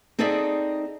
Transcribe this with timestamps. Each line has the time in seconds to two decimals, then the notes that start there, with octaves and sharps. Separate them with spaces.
0.19 C4 D#4 G#4 A4 D5 E5